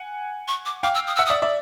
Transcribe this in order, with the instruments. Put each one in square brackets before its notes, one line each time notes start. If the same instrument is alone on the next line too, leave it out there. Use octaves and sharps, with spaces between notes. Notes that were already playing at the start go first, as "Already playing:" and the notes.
Already playing: [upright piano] F#5 G#5
[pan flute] C#6
D6
[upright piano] F5 G5 [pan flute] D6
[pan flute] E6
D#6
[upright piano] E5 F#5 [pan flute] E6
[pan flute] D#6
[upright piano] D5 E5
D5 E5